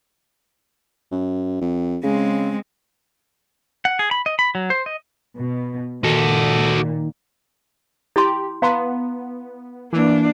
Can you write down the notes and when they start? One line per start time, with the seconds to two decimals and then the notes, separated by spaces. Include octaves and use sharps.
1.12 F#2
1.61 F2
2.03 C#3 G#3 C4
3.85 F#5
3.99 G#4
4.11 B5
4.26 D#5
4.39 B5
4.55 F#3
4.70 C5
4.86 D#5
5.37 B2
6.04 A#2 D#3 F#4 A4
8.16 E4 G4 C6
8.62 B3 F5 A#5 C6
9.93 E3 A#3 D4